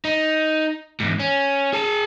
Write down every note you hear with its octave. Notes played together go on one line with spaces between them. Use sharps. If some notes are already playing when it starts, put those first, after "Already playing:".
D#4
E2 G#2
C#4
G#4 A5